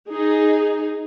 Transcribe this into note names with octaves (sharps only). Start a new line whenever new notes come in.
D#4 G#4